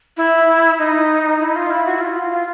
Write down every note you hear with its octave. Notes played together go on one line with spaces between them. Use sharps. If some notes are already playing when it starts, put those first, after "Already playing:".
E4
D#4
E4
F4
E4
F#4
E4
F4
F4